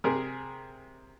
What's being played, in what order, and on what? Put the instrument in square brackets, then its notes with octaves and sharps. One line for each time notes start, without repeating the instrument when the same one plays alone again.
[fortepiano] C3 G#4 A#4